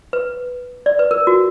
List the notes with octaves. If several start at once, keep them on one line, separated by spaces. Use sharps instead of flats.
B4
D5
B4
A#4
F#4